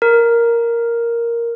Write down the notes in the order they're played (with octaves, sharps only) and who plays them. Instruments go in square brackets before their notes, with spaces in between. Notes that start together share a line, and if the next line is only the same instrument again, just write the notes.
[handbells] A#4